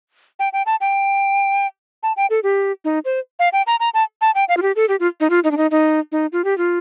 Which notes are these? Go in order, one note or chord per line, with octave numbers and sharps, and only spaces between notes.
G5
G5
A5
G5
A5
G5
A4
G4
D#4
C5
F5
G5
A#5
A#5
A5
A5
G5
F5
F4
G4
A4
G4
F4
D#4
F4
D#4
D4
D#4
D#4
D#4
F4
G4
F4